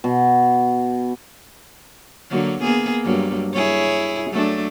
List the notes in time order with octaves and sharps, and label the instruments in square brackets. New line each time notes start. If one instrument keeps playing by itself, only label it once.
[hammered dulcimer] B2
[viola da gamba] D3 F#3 A#3
A#3 B3 G#4
G2 F#3 A#3
E4 G#4 C#5
F#3 A3 D4